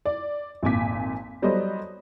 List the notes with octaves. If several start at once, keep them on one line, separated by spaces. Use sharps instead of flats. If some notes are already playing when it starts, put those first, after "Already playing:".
D5
G#1 F2 A#2 G#5 D6 B6
F#3 G3 B3 A4 C5 D#5